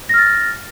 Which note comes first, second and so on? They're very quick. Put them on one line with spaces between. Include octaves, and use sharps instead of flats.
A#6 F6 A6